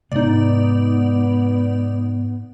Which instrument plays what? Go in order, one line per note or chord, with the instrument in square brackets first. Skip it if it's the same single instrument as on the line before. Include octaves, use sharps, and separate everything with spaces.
[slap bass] G#2 C3 G#3 [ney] B3 [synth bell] D#4 D5